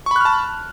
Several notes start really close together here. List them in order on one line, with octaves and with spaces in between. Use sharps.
C#6 B5 F#6 F6 A5